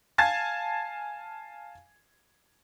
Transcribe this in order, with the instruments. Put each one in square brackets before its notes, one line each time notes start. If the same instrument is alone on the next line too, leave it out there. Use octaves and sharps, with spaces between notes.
[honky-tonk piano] F5 G#5 A5 G#6 A6